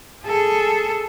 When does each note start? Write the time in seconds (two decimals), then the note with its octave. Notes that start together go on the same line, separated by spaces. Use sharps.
0.24 G#4 A4